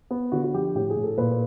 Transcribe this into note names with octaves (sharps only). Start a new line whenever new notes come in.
B3
D3 F#4
F#4
F3 G4
A2 G4
G#4
A2
A4
A#2 B4